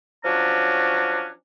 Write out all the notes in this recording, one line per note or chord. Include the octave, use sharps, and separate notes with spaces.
F3 F#3 C#4 D4 A#5